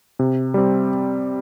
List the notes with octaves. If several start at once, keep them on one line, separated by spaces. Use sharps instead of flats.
C3
G3 C4